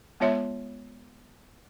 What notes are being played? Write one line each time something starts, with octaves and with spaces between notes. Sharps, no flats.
G#3 B3 F4 C#5 E5 C6